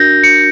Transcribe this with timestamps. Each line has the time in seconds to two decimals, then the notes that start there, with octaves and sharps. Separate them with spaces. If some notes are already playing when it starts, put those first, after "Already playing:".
Already playing: D4 F#4 A#4 G6 A#6
0.23 C#7